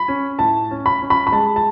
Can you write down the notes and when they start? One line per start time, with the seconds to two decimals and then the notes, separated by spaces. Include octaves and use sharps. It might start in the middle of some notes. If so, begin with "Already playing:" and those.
Already playing: B5
0.08 C#4
0.39 A2 A5
0.71 C#4
0.86 B5
1.02 C#4
1.10 B5
1.27 B5
1.32 G#3 A5
1.56 A5